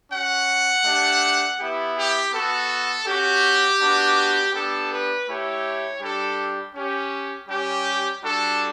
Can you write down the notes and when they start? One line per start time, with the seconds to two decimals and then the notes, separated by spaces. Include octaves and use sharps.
0.11 C#4 F#4 F#5
0.85 A3 D4 G4
1.59 B3 E4 G4
1.96 G4
2.33 B3 F#4 A4
3.06 C#4 F#4 G4
3.80 B3 D4 F#4
4.53 B3 D4 G4 A4
4.91 B4
5.27 A3 E4 G4 C#5
6.01 G3 D4 G4 A4
6.75 C#4 G4
7.48 G3 C#4 G4
8.22 G3 D4 F#4 A4